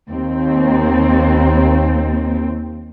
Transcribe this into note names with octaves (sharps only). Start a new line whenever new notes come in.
D#2 C4